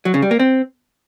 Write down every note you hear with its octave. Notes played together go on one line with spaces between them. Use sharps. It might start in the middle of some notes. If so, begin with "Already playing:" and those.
F#3
C#3
G3
A#3
C4